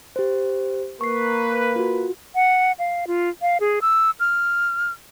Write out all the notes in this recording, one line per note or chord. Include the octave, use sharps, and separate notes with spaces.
G4 C5
A#3 A#4 B4 C#6 C7
F4 F#4
F#5
F5
F4
F5
G#4
E6
F6